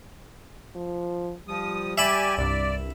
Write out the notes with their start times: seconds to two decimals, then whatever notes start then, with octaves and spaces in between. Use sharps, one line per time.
0.76 F3
1.48 F3 G3 D#6
1.98 G4 D5 E5 G#5 B5
2.38 C2 G2 D5